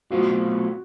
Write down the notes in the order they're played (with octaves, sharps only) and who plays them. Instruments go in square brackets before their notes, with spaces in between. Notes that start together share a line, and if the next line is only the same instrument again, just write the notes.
[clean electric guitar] B2 F#3 A3 C4 F4 [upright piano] F#4